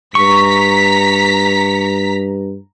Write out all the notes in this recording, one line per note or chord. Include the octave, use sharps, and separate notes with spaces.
G2 A#5 C#6 B6